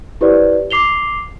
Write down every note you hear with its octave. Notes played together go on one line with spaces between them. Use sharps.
E4 G4 B4 C5 D5
D6 C7 F7 G7